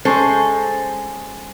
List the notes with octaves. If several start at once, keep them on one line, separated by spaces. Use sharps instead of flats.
G#3 C#4 A4 C5